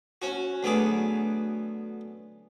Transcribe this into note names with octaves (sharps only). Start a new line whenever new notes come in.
C#4 F#4
D2 F#3 B3 G#4 D6